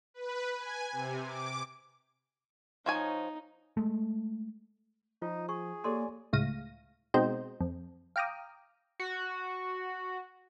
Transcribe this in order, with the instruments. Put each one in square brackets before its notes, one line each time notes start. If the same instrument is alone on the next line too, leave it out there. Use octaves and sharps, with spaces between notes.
[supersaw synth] B4
G#5
C3
D6
[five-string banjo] F3 C#5 G#5 [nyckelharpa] D#4
[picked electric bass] G#3 A3
[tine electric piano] F3 [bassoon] D#4 [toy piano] F4
[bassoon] G#4 [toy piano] C#6
[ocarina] A#3 [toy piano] G4 A4 C6 [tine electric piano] C#5 D5 G#5
[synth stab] C#2 A2 F5 A#6 D#7
B2 G#3 C4 D#4 C5 G5
F2
F5 G5 A#5 D6 D#6
[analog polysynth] F#4